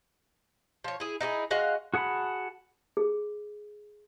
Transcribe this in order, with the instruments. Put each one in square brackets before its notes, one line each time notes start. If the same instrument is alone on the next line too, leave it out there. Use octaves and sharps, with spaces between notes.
[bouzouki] F3 C#5
E4 G#4
D#4 E4 G4 G#4
G#3 F#4 D#5 F5
[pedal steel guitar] F#4 G#4 F#5 A5 B5
[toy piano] G#4